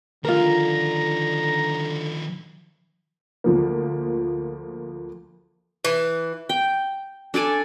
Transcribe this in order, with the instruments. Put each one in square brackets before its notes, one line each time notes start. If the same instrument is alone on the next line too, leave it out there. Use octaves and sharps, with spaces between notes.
[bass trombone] D3 [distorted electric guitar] D#3 F3 [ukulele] F4 A#4 [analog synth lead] A#5
[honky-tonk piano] D2 F3 A#3
[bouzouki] E3
[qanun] G5
D4 A4 D5 G#5